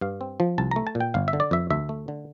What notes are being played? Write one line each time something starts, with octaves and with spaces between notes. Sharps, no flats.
G2 F5
C4
F3
C2 A5
A3 A#5
A5
A#2
G5
G1 F5
E5
D3
D5
F2 E5
D2 E5
A3
D3